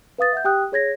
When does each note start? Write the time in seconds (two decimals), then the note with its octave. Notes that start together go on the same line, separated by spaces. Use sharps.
0.18 B4 F5 D#6 A6
0.33 E5 F#5 G6
0.45 G4 G5 D#6 F#6
0.72 G#4 C#5 G#6 A#6